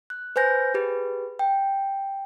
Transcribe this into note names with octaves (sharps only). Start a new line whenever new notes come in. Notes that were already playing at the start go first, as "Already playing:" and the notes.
F#6
B4 C5 G#5 G6 A#6
G4 G#4 B4
G5